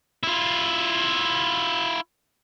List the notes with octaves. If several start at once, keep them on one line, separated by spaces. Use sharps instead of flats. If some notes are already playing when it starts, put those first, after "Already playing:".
E4 F4